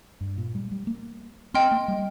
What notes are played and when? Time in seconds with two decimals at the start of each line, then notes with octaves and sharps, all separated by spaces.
0.21 G2
0.38 A#2
0.55 G3
0.71 G3
0.87 A#3
1.54 C4 D#5 G5 C6 F6
1.71 A#3
1.88 G3